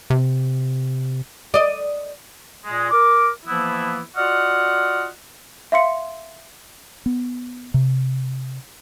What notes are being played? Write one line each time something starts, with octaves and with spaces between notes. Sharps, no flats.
C3
D5 D#5
A#2 G#3
A#4 D6
E3 F3 A#3 B3 E4
F4 F#4 D5 D#5 F#5 F6
E5 F5 C6 C#7
B3
C3